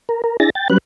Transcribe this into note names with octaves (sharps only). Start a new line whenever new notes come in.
A#4
A#4
D4 E4 G#4 A6 A#6
G5 A6
F#3 G3 C#4 B4 F#6